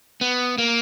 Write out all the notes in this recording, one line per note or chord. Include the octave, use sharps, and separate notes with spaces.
B3
A#3